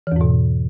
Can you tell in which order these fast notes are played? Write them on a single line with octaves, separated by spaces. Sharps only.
E3 E2 G#2 B2